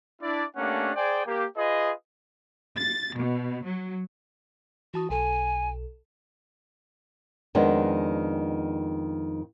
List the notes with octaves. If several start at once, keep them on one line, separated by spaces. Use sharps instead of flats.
D4 E4 D5
A3 A#3 C#4 D4 G4 F#5
G#4 C5 D5 G5 G#5
A#3 G4
F4 G#4 B4 D#5
A6
B2
F#3
E3 F#4 A5 D#6
B1 A4 G#5
F2 D#3 G#3 B3 D4